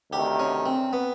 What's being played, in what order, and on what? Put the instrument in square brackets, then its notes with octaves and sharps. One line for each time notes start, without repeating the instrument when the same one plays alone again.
[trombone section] D2 C3 D#3 [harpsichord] G4
[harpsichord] C#4
C4
B3